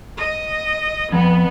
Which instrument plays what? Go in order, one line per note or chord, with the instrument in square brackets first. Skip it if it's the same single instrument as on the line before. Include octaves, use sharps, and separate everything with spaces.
[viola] D#5
[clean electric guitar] F2 [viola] B3